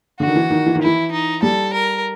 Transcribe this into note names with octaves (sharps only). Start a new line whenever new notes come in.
D3 F#4
D#3
E3
D#3
E3
D#3
E3 E4
D#4
G3 A4
A#4